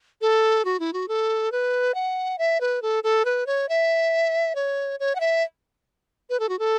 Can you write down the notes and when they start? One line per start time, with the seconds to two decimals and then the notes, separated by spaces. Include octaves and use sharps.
0.21 A4
0.65 F#4
0.80 E4
0.93 F#4
1.08 A4
1.52 B4
1.95 F#5
2.38 E5
2.61 B4
2.82 A4
3.04 A4
3.25 B4
3.46 C#5
3.69 E5
4.55 C#5
5.00 C#5
5.15 F#5
5.20 E5
6.30 B4
6.40 A4
6.49 F#4
6.59 A4